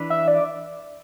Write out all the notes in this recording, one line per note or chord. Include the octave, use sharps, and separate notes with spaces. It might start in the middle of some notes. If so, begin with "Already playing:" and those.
Already playing: E3 D4 B4
E5
D5